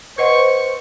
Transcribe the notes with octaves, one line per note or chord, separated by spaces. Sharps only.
B4 C5 D#5 F#5 C#6